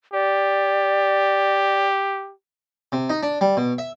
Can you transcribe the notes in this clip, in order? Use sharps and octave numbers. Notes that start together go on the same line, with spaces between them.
G4 D5
C3
D#4
D4
G3
B2
E5